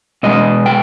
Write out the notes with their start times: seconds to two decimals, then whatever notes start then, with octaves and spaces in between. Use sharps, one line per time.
0.23 B2 G#3 B3 D#5
0.66 G5